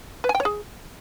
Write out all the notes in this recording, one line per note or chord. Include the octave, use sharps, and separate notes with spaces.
B4
G#5
G5
C#5
G#4